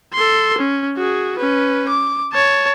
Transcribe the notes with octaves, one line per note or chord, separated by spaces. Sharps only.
A4 C6
C#4
F#4 G#4
C#4 B4
D6
C#5 A5